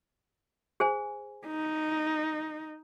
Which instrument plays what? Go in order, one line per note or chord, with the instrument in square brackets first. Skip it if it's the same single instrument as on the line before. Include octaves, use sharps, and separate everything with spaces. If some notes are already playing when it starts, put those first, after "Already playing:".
[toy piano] G#4 C5 G#5
[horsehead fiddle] D#4